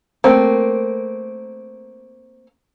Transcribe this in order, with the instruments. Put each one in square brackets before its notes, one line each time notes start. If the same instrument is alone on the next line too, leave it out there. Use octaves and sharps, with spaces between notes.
[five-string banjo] A3 A#3 C4